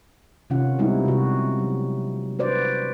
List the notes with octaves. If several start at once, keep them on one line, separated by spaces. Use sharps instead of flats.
C3 D#3 C#4 F4 F#5
G3 G#3 B3 C4 D#4 E4
C3 F#4
F#3
F#4 B4 C5 D5